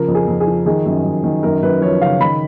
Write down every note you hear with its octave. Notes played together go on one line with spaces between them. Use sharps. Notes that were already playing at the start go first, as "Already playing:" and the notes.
Already playing: C#3 F3 A#4
F2
G#4
F2
G#4
F3
D#3 G#4
F#2
F#2
D#3
F#2 A#4
F#2 B4
F3 C#5
C#3 F5
D#3 B5